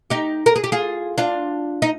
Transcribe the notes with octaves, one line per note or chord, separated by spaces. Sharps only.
D#4 G4
A#4
G#4
G4
F4 G#4
D4 F4
D#4